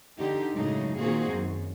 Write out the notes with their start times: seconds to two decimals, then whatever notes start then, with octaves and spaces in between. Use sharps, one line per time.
0.19 D3 D#4 G4
0.54 F#2 A2 C#3 F#3 G#3 D#4
0.99 A#2 D#3 A#3 C4 F#4 G#4
1.34 F#2